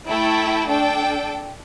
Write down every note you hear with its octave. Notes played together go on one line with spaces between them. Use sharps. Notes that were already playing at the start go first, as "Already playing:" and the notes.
A3 E4 A4 G5
D4 A4 G5